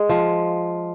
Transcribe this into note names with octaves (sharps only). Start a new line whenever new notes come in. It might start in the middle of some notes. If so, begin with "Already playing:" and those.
Already playing: G#3
F3